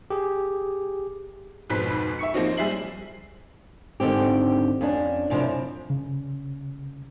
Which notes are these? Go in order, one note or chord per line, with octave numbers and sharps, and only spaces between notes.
G4 G#4
F2 G#2 B2 B4 C5 B6
E5 C#6 C#7
F3 A#3 C4 D#4
G3 G#4 C5 E5 C7 F#7
G#2 D3 D#3 C4 G4
F2 C#4 D4
F#2 C3 F3 D4 E4
C#3